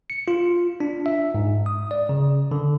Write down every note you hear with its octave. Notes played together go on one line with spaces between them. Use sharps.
C#7
F4
D4
E5
G#2
D#6
D5
C#3
D3